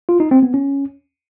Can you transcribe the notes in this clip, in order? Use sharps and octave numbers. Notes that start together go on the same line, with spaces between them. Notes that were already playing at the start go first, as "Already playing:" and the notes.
F4
D#4
C4
B3
C#4